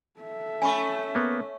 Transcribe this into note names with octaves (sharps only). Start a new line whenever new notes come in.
A4 E5
A3 C#4 G#5 B5 C#6
A#3 B3